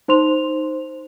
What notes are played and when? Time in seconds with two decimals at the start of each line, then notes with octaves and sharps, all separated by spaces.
0.08 D#4 C5 C6 F7